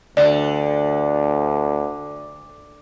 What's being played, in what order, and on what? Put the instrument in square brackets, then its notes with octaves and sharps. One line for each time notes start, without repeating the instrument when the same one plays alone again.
[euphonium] D2 [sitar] D3 [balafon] D5